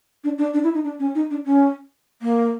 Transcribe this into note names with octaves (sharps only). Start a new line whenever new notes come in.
D4
D4
D4
E4
D#4
D4
C#4
D#4
D4
C#4
A#3